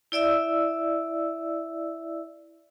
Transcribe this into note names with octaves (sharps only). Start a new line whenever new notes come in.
E4 D5 E5 E6